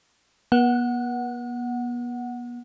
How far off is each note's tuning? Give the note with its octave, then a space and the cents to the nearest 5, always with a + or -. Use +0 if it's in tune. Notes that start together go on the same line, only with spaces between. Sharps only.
B3 -40 F#5 +0